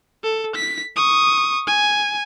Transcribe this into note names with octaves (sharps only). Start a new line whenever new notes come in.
A4
B6
C#6 D#6
G#5